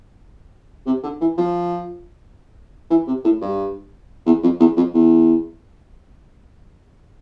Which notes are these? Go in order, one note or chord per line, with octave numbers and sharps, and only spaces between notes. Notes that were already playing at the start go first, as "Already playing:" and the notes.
C3
D3
E3
F3
E3
C3
A2
G2
E2
F2
E2
F2
E2